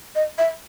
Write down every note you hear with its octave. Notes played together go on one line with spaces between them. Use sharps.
D#5
E5